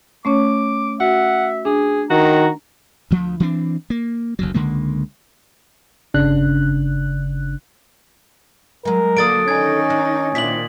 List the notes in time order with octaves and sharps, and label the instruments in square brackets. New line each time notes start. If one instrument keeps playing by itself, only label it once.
[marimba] A3 C#4 C#5 [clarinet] D6
[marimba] F#4 [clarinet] E5 [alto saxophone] F#5
[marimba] D4 [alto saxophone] G#4
[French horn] D#3 [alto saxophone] F#4 [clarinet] A#5
[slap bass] D2 F3
E3 C4 D4
A#3
F#1 D2 F#3
C#2 D3 G#3 A#3
[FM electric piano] G1 C#3 D4 F#6
[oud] F#3 G#3 [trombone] A#4
[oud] D3 A4 D5 [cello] F#3 A#3 [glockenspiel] D#6 A6 D7
[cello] D#3 D#4 [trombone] C#4 [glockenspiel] G#5 G#6
[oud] D4
[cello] A#2 D#3 [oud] C4 D4 E4 [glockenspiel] B6 F#7